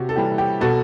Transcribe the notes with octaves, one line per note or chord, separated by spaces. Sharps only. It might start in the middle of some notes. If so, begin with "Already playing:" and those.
Already playing: C3 F#4 G4
A4
E3 G3 G4
G4
B2 F#4 A4